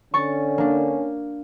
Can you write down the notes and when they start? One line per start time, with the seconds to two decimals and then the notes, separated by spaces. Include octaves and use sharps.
0.14 D3 C#4 C#6 A6
0.58 A#3 D4